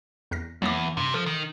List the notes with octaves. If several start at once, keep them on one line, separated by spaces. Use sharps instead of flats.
E2 F6 A#6
E2 F#3 A#3 D6
G2 C3
F3 A4
D#3